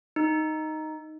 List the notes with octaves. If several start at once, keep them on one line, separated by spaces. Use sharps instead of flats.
D#4